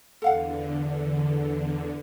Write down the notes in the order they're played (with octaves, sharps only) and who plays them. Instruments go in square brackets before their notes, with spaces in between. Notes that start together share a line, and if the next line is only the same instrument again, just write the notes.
[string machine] E2 D3 [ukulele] A4 F5 F#5